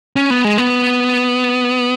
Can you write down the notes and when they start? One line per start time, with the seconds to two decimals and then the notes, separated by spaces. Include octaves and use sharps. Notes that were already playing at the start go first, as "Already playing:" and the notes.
0.16 C#4
0.30 B3
0.45 G#3
0.58 B3